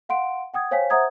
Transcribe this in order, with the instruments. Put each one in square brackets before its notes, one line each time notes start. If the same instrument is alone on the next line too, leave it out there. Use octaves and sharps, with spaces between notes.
[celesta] F5 F#5 C6 D7
F#5 G5 D#6 G#6
C5 C#5 F5 G5 G#5 B6
C5 E5 F#5 A#5 D#6 G#6